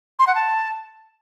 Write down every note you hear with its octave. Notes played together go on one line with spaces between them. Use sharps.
C6
F#5
A5